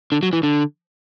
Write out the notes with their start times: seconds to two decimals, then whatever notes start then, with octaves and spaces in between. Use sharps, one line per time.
0.12 D3
0.23 F#3
0.33 E3
0.43 D3